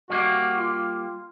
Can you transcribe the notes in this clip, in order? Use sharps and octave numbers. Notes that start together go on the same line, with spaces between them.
G3 A#3 F#4
F4